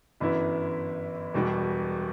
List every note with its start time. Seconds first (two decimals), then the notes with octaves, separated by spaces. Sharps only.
0.20 G1 F#2 E3 B3 E4
1.34 E1 E2 B2 G3